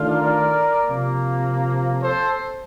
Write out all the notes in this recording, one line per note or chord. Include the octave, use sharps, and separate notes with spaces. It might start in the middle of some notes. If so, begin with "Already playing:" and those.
Already playing: D#3 A3 D4 F4
A#4 D5
C3 F3 A#3
A4 C5